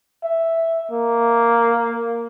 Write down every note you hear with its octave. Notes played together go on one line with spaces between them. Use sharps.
E5
A#3